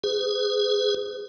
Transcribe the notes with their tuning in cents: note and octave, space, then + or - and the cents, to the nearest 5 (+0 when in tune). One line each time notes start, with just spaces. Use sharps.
G#4 +0 B4 +40